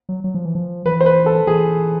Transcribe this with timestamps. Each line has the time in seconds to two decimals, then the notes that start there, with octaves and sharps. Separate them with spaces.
0.09 F#3
0.24 F#3
0.35 F3
0.45 E3
0.55 F3
0.85 E3 B4
1.01 C5
1.06 B4
1.26 A4
1.47 E3 G#4